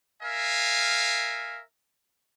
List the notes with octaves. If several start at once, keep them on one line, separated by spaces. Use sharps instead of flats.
A#4 E5 F5 G#5